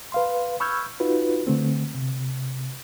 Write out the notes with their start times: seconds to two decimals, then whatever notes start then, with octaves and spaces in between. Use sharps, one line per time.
0.12 B4 F5 C6
0.60 B5 C#6 E6 F6 G6 G#6
1.00 D#4 F4 F#4 B4
1.47 D3 A3 C4
1.94 C3